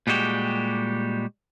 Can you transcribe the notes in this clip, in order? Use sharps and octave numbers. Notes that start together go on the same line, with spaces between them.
A#2 G3 G#3 F#4 G4